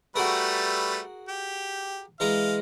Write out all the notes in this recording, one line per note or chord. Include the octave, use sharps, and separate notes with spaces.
G3 A3 F#4 G#4 A#4 B4
G4
E3 G#3 F5 A#5